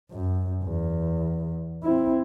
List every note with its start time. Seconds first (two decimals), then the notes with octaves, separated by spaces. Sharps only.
0.11 F#2
0.63 E2
1.83 C4 E4